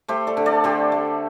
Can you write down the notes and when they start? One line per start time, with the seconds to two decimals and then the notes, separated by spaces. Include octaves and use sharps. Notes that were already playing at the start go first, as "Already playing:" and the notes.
0.08 A3 G4 C5
0.27 A4 D5
0.37 D3
0.46 A4 D5
0.64 D3 G4 C5
0.92 A3